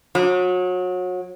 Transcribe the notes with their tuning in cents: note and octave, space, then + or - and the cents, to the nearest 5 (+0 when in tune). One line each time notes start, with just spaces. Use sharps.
F#3 -30